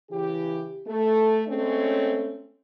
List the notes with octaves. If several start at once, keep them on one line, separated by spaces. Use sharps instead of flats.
C#3 E3 G4
A3
G#3 A3 C4 C#4